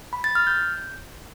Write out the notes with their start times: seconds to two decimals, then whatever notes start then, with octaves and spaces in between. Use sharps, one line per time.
0.13 B5
0.24 A6
0.35 F6
0.47 G6